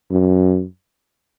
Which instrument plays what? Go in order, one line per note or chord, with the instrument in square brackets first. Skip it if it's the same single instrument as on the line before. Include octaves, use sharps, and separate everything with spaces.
[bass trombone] F#2